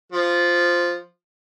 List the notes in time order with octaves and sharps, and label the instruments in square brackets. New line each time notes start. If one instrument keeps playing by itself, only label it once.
[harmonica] F3